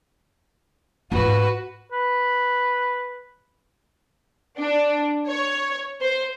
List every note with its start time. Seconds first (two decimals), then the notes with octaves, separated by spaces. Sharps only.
1.12 G#2 F4 F#4 B4
1.92 B4
4.59 D4
5.27 C#5
6.02 C5